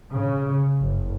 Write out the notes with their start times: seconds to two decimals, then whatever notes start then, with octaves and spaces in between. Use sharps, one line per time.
0.12 C#3
0.81 F#1